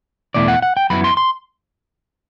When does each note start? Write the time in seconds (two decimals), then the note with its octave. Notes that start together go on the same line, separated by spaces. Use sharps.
0.34 E2 B2 A3 E4 D5
0.48 F#5
0.62 F#5
0.77 G5
0.90 F#2 F#3 B3 E4 B5
1.04 C6
1.17 C6